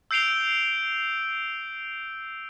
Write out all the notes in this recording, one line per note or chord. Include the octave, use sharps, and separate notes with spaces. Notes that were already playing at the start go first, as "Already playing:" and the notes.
E6 G6 C7 D7 F7 G7